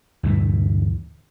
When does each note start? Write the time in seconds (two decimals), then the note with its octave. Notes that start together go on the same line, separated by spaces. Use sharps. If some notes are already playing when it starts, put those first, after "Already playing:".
0.23 D2 G2 A#2 E3